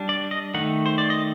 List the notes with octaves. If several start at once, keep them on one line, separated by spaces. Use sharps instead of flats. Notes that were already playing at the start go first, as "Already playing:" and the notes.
Already playing: G3 D4
D5
D#5
D#3 A3 D#4 F#5
C5
D5
D#5